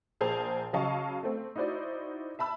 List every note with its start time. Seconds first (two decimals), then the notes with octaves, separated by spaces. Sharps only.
0.21 A#1 G#4 A#4 C5 A5 F7
0.73 C#3 F#3 D#5 F5 A5 C#6
1.23 A3 C4
1.56 D#4 E4 F#4 C5 D5
2.39 E5 A5 B5 E6